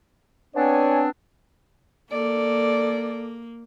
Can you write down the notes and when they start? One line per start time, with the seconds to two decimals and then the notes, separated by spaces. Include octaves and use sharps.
0.55 B3 C4 D4 C#5 D5 G#5
2.12 A#3 A4 D5